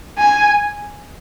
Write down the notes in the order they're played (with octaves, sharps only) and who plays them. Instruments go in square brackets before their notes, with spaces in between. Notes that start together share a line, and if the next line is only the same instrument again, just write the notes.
[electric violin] G#5